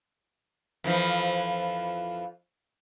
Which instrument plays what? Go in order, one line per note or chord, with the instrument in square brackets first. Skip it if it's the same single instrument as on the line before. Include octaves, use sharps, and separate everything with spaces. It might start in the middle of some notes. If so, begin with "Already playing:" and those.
[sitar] F2 E3 F3